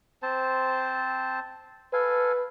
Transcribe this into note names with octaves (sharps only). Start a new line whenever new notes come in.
C4 C5 A5
A4 B4 F5 G#5